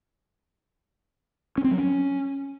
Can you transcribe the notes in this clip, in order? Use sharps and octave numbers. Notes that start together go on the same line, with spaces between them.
C#4
C4
F#3
C#4